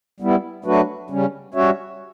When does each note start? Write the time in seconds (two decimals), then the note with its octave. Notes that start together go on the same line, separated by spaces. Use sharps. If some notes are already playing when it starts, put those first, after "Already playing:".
0.20 G3 B3 E4
0.65 F#3 A3 D4 F#4 B4
1.10 C#3 G3 C#4
1.54 G3 C#4 F#4 C#5 E5